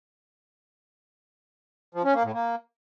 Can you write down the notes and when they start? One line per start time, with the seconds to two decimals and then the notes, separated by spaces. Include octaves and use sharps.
1.94 F3
2.04 C#4
2.14 A#3
2.24 A2
2.33 A#3